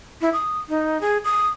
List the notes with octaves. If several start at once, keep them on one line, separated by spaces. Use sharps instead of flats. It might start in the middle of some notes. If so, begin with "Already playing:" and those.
E4
D#6
D#4
G#4
D#6